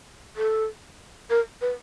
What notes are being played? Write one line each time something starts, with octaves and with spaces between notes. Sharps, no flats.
A4
A#4
B4